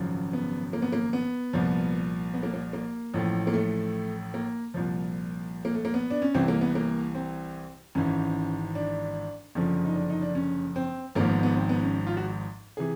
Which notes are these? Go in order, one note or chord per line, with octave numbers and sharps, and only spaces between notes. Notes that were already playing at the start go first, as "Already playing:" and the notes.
Already playing: G#1 F#2 C#3 F3
B3
A#3
B3
A#3
B3
C2 A#2 F3
B3
A#3
A#3
A#3
A1 A2 F3
A#3
A3
A#3
C2 A#2 F3
A#3
A3
A#3
B3
D4
C#4
C2 C3 E3 C4
A#3
B3
A#3
C4
G#1 G#2 E3 C#4
D4
F#1 F2 D3 F3 C#4
D#4
D4
D#4
D4
C#4
C4
G#1 G#2 F3 A#3
B3
B3
C4
B3
C#4
F4
F#4
C3 E3 G#4